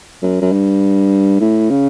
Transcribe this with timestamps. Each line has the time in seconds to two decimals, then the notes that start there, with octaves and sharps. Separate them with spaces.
0.23 F#2
0.42 F#2
0.52 G2
1.41 A2
1.71 C#3